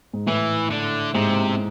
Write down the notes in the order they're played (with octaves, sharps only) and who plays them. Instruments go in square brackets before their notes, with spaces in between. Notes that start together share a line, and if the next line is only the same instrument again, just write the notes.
[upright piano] G#2
[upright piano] A2 [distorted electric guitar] E3
[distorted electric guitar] D3
[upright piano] G#2 [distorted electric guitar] C3